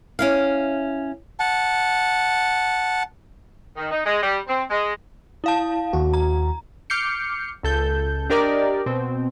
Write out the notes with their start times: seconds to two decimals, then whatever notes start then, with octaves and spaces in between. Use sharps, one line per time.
0.19 C#4 E4 F5
1.40 F#5 A5
3.76 D#3
3.91 D#4
4.04 G#3
4.21 G3
4.48 C4
4.69 G#3
5.44 E4 F5 A5
5.93 D#2 F#4
6.13 A#5
6.90 D6 F6 G6 C7 C#7
7.63 C#2 A4 G6
8.29 D4 G4 A#4 D5 D#5
8.86 B2 C4